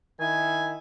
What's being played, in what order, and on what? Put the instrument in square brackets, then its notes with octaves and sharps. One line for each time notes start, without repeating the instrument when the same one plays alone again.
[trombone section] D#3 E4 [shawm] G#5